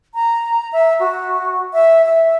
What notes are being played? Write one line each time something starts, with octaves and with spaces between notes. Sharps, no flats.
A#5
E5
F#4
E5
E5